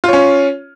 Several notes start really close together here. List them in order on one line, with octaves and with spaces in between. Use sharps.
F4 C#5 C#4